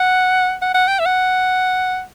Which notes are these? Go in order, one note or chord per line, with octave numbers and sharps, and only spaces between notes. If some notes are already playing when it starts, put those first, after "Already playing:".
Already playing: F#5
F#5
F#5
G5
E5
F#5